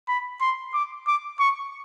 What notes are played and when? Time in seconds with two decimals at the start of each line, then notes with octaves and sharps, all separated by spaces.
0.08 B5
0.41 C6
0.74 D6
1.07 D6
1.39 C#6